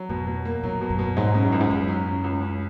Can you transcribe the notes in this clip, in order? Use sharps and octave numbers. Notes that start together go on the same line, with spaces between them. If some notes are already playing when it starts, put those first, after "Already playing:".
Already playing: F#3
F2 B2
B2
A#3
A#2 F#3
B2
F#2
B2
G#2 F#3
C#3
F#2
C#2
G#2
F#2 C#4
F#3
C#3
C#2
C#4